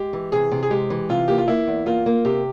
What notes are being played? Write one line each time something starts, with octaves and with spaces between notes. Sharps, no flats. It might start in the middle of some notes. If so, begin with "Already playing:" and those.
Already playing: G#3 G4
E3
C3 G#4
C3
G#4
G#3 G4
E3
C3 F4
A#3 G4
F4
A#3 E4
E2
A#3 F4
A#3
C3 G4